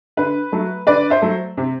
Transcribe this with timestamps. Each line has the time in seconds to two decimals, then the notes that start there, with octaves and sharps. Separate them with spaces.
0.17 D3 B4
0.52 F#3 A3
0.87 D3 B4 D5
1.10 C5 E5
1.22 F#3 A3
1.57 C3